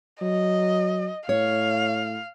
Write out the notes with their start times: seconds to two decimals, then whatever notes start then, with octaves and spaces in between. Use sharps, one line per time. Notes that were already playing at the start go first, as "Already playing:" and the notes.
0.22 F#3 D#5
1.29 A2 C#5 F5